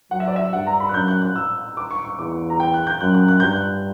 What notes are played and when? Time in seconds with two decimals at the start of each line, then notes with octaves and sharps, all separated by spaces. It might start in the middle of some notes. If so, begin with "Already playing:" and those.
0.11 F#3 F#5
0.20 E5
0.28 D5
0.36 E5
0.53 G2 F#5
0.67 A#5
0.80 B5
0.89 F#6
0.94 F#2 G6
1.08 F#6
1.22 F#6
1.36 E6
1.77 D6
1.91 C#6
2.04 C#6
2.18 E2 D6
2.50 A#5
2.60 G5
2.74 F#6
2.87 G6
3.01 F#2 F#6
3.14 F#6
3.28 F#6
3.40 G2 G6
3.53 F#6